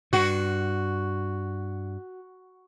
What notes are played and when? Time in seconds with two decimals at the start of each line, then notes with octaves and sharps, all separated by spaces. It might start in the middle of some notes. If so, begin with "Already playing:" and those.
0.13 G2 F#4